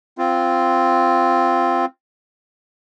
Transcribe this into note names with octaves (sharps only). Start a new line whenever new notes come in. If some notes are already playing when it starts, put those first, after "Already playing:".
C4 F4